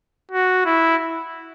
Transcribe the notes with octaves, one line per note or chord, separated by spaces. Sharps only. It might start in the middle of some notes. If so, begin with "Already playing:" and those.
F#4
E4